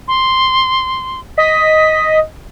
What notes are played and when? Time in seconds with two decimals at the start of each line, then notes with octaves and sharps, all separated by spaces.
0.08 C6
1.38 D#5 B6